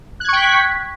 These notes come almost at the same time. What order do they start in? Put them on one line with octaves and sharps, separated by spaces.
F#6 G#6 C#6 G5 B6